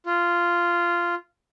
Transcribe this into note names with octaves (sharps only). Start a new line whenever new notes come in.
F4